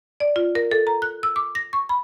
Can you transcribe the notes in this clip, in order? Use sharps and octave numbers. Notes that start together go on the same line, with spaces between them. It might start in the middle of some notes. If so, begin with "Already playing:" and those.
D5
F4
A#4
A4
A#5
F#6
E6
D6
A#6
C#6
B5